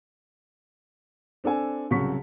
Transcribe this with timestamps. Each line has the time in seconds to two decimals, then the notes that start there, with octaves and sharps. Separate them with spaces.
1.44 C4 D4 A4 G#5
1.90 C2 C#3 F#3 C#6 B6